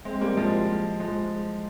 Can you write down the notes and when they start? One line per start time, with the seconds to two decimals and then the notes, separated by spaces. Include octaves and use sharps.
0.05 G#3 C4
0.21 G3 A#3
0.37 F3 G#3
1.00 F3 G#3